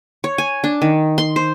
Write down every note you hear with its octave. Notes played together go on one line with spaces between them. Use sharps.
C#5
G#5
D4
D#3
C6
C5